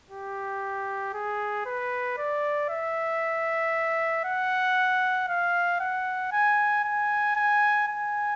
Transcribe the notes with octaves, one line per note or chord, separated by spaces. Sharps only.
G4
G#4
B4
D5
E5
F#5
F5
F#5
G#5
G#5
G#5
G#5